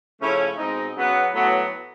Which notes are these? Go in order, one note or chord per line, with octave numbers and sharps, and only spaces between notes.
C#3 F3 A3 C#4 E4
B2 G#3 C4 D#4
C#3 F#3 B3
A2 F#3 B3